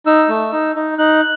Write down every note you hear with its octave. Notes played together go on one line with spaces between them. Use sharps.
D#4 E6
A3
D#4
D#4
D#4 F#6